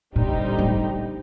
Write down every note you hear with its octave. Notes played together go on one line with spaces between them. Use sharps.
A#2 D3 G3 C4 D#4 G4
A2